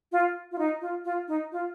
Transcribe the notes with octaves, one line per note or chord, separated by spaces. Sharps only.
F4
F4
D#4
F4
F4
D#4
F4